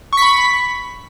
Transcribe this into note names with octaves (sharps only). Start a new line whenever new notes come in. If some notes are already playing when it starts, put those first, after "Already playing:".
B5 C#6 B6